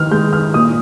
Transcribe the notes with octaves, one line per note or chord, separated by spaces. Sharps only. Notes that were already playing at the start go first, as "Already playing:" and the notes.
Already playing: D#3 F6
G#3 G6
F6
A#2 D#6